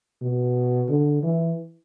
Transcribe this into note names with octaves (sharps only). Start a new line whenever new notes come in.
B2
D3
E3